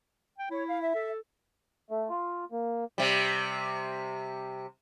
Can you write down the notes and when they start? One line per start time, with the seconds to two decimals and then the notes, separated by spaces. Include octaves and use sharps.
0.38 G5
0.50 E4 C#5
0.67 F5
0.81 E5
0.95 A4
1.91 A3
2.09 F4
2.52 A#3
2.98 C3 G3